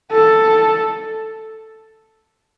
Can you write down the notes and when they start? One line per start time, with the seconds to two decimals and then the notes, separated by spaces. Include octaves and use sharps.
0.12 A4